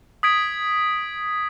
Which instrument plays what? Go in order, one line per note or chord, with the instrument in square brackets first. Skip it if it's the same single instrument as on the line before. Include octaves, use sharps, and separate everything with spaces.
[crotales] D#6 G#6 B6 D7